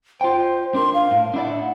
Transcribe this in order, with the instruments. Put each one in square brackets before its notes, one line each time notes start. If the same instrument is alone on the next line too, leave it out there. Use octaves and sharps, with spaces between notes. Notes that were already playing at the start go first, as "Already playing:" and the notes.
[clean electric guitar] F4 G5 [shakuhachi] C5
[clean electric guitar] D4 A#4 [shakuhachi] C6
[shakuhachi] F5
[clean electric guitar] A2
[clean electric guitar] D4 E4 D5 [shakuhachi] F#5